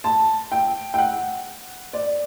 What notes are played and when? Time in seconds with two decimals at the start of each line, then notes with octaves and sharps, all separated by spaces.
0.04 A5
0.52 G5
0.94 G5
0.98 F#5
1.93 D5